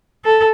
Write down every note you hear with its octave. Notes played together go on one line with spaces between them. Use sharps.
A4